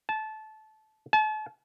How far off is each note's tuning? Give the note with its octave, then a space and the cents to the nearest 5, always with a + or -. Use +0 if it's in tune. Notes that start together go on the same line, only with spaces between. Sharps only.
A5 -20
A5 -40